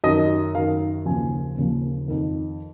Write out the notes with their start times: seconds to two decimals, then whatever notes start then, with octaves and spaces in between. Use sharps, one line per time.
0.04 F#2 D#3 D#5
0.55 F#2 D#3 F5
1.06 D#2 C#3 F3 G#5
1.57 D#2 C#3 F3
2.08 F2 D#3